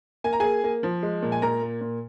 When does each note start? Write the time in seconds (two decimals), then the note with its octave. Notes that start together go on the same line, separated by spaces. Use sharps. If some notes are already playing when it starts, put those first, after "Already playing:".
0.24 A#3 G#5
0.33 A#5
0.40 A#3 G#4 G#5
0.64 A#3
0.83 F3
1.03 G#3
1.22 A#2
1.32 G#5
1.42 A#2 A#4 A#5
1.62 A#3
1.81 A#2